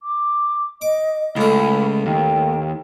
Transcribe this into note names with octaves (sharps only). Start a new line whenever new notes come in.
D6
D#5 D6
C#2 A2 A3 B5
D#2 G5